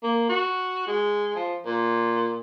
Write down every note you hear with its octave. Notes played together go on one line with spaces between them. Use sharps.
A#3
F#4
G#3
F3
A#2